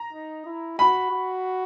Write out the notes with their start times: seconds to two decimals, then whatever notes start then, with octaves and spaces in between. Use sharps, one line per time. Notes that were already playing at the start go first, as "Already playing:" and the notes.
Already playing: A#5
0.13 D#4
0.46 E4
0.79 F#4 B5
1.11 F#4